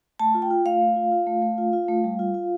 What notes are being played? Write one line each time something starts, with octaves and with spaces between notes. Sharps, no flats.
A3 A5
F4
G5
F4
A3 F5
A3
F4
F4
A3
A3
F4
F4
A3
G3
F4
F4